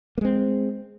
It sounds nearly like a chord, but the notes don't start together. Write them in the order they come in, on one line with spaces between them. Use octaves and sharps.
A#3 G#3 C4